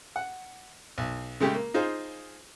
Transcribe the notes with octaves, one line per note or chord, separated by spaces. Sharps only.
F#5
B1
C#3 G#3 A3 G4
A#3
D#4 F4 G#4 C5